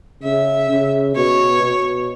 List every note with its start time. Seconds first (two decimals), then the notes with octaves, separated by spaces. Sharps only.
0.23 C#3 E5
0.70 C#3
1.16 B2 C#5
1.63 B2